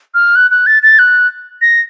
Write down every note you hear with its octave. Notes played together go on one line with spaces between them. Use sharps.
F6
F#6
F#6
A6
A6
F#6
A#6